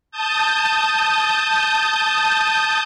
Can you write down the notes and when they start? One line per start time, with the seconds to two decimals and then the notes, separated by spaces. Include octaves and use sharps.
0.12 A5 D#6 G6